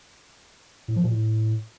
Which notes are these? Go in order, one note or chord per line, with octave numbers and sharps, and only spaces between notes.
A2
F3
A#2
A2